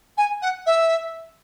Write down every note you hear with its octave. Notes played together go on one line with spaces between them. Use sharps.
G#5
F#5
E5